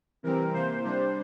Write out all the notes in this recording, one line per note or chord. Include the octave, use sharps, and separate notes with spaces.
C3 E3 G3 C4 A#4
C3 E3 A#3 C5
C3 G3 D4